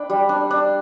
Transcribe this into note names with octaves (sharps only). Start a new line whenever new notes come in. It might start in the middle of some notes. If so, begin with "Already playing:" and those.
Already playing: D4 G5 B5
G3
D4
D4